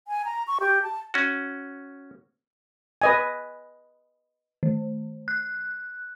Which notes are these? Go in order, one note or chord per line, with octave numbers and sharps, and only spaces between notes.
G#5
A#5
C#6
G4
A5
C#4 F#4
B4 D#5 G#5
D#3
F#6